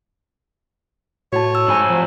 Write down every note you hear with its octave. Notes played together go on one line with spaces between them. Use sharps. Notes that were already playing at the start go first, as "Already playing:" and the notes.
A2 F#4 C#5 A5
E6
F2 G#2 G#5
F3